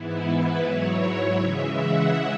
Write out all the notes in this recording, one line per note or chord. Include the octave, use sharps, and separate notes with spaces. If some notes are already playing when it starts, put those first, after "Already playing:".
Already playing: G#2 E3 B3 E4
B4
G#2 F#3 E4 C#5
C#3 E3 G#3 E5
F#5